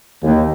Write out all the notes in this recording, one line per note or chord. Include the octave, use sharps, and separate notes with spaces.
D#2